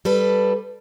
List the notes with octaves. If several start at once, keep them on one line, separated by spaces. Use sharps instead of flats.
G3 A4 B4